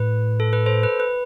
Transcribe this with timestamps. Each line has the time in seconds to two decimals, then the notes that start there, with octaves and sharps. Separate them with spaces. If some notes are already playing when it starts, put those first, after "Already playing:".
Already playing: A2 B4
0.40 A4
0.53 B4
0.66 A4 C5
0.83 B4
1.00 B4